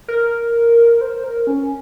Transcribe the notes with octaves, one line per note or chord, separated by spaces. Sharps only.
A#4
C5
A#4
C#4